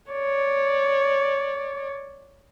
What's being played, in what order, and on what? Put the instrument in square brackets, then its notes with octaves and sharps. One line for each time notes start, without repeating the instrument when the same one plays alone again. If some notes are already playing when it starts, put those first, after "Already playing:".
[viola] C#5 D5